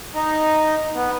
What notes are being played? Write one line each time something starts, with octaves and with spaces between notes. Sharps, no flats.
D#4
B3